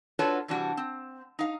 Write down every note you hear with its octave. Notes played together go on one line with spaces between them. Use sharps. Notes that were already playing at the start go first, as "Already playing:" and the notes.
D4 F4 F#4 A4 B4 C#5
C3 E3 G3 D4 F#4
C4
D#4 F5